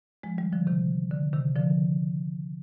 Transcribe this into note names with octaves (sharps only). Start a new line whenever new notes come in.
F3 G#3
D#3 G3
D3 F3
C3 D#3
D3
C3 D#3
D3 F3